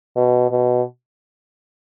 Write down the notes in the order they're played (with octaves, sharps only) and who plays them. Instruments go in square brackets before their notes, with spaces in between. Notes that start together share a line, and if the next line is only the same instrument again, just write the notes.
[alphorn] B2
B2